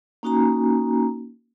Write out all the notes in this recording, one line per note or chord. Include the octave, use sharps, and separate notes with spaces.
A#3 C#4 D#4 F#4 G#5 A#5